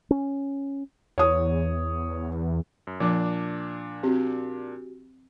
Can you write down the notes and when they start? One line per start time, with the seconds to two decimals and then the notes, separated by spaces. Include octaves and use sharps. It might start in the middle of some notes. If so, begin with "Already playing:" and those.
0.11 C#4
1.18 E2 C#5 D#6
2.87 F#2
3.00 A#2 F3 D4 D6
4.03 C4 F#4 G4